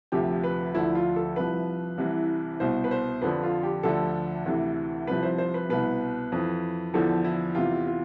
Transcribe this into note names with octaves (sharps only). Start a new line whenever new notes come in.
D2 C3 F3 G4
B4
D2 D3 F3 E4
F4
A4
C2 C3 F3 B4
C2 C3 E3
C2 B2 C5
B4
C5
F2 D3 F3 B4
F4
G4
D2 D3 F3 A4
D2 C3 E3
C2 C3 F3 B4
C5
C5
B4
C2 B2 B4
F2 E3
E2 D3 F3 A4
E4
E2 C3 E3 F4
F4